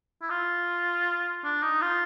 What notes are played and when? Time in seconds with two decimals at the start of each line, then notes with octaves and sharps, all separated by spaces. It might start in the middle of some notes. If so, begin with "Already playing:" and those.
0.22 E4
0.30 F4
1.44 D4
1.63 D#4
1.82 F4